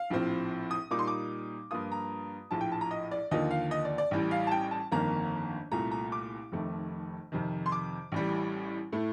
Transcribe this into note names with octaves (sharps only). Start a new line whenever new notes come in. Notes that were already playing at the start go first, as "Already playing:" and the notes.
Already playing: F5
A#1 A2 F3 C4
D#6
A#2 G3 A#3 D#4 D6
C6
D6
G2 F3 A#3 F4 D#6
A#5
A#1 A2 F3 A5
G5
A5
A#5
D#5
D5
D#2 D3 F3 A#3 D#5
F5
D#5
D5
D5
A1 A2 G3
F5
A5
G5
A5
G1 F2 D#3 A#3 A#5
C2 A#2 A3 A#5
A#5
D6
F1 F2 D#3 A3
F2 C3 D#3
C6
D6
A1 A2 G3
A2 A3